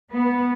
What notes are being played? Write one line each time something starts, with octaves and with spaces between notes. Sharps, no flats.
B3